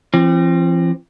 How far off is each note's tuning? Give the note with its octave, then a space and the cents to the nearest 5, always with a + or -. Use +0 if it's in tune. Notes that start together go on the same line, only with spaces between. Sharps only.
F3 -45 C4 +25